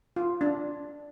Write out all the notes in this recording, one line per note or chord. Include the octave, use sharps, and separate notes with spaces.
F4
D4